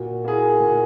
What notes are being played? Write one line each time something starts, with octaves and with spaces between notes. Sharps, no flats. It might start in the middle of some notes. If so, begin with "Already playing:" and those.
Already playing: A#2 F#4
A#3 E4 G#4
A#2